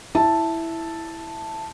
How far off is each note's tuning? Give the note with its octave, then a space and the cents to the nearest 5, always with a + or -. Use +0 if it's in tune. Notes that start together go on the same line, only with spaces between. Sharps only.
E4 +0 A5 +0